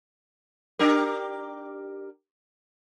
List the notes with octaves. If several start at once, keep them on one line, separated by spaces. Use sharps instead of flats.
D4 G4 A#4